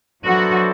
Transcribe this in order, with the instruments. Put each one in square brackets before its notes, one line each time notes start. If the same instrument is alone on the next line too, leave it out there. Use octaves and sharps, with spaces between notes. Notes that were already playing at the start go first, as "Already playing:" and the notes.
[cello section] F#3 F#4 [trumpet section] B3 D4 A4 C5 E5